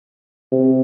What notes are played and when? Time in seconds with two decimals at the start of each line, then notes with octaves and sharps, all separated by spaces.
0.52 C3